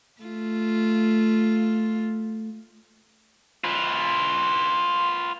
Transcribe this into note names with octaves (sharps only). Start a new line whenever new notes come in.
A3 F4
F4 B4